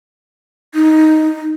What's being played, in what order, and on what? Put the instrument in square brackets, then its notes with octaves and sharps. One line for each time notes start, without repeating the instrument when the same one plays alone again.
[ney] D#4